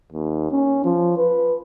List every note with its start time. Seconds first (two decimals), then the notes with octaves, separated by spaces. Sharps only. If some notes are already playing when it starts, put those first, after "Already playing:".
0.12 D#2
0.52 C#4
0.84 F3
1.17 B4